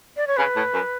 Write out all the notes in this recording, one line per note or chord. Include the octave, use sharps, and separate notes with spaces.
D5
C#5
C#3 B4
A2
F#2